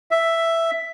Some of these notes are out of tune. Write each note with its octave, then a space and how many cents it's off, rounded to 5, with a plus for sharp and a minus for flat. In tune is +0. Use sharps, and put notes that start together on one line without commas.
E5 +5